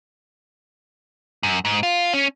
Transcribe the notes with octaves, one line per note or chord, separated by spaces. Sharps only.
F#2
G#2
F4
C#4